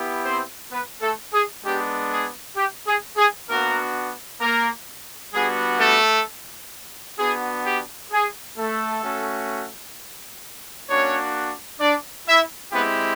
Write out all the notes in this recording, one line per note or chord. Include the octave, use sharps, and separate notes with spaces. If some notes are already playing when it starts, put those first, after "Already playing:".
Already playing: B3 E4 G4
C4 C5
B3 B4
A3 A4
G#4
G#3 B3 D4 G4
G#4
G4
G#4
G#4
A#3 B3 D4 F#4 A#4
A#3 A#4
G3 B3 D4 F#4 G#4
A3 A4
B3 D4 F#4 G#4
G4
G#4
A3 A4
A3 C#4 F#4
A#3 C#4 D4 F#4 C#5
D4 D5
E4 E5
G#3 B3 C4 E4 G4 B4